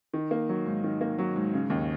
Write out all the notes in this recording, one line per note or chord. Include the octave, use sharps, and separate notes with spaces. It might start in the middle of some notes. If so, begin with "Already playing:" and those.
D#3
A#3
F#3
G#2
D#3
A#3
F#3
G#2
C#3
D#2